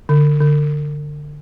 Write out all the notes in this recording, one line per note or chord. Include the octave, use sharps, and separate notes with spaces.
D3
D3